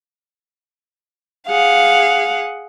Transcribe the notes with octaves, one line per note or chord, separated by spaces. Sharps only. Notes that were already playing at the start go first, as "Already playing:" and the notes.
G#4 F5 F#5